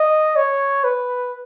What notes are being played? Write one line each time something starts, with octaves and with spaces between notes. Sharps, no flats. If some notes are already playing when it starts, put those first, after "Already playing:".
Already playing: D#5
C#5
B4